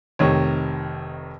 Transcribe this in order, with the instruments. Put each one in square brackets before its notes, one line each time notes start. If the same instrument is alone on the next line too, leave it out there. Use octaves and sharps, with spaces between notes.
[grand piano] F1 C3 D#3 C#5